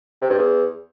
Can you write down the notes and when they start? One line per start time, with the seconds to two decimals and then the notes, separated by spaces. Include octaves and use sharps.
0.21 C3
0.30 G2
0.38 E2